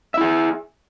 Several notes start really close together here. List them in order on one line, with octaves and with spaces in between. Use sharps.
E5 E4 G#4